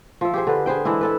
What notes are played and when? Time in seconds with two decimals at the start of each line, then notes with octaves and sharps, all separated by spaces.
0.21 F3 E5
0.34 G4 G#4 C5
0.47 D3 B4
0.66 G#4 B4 C5 G5
0.85 E3 G#3 D4 E4
1.01 E4 A4 B4